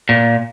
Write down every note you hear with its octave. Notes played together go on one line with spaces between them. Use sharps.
A#2